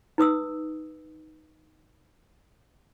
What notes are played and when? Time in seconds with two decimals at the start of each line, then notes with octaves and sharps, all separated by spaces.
0.18 D#4 B4 D#6 E6